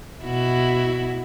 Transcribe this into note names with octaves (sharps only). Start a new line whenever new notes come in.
B2 E4 F#4